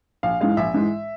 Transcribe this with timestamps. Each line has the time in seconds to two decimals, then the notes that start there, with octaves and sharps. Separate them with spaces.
0.23 A#1 F5
0.41 G#2 E3 G#3 F5
0.57 A#1 E5
0.74 G#2 E3 G#3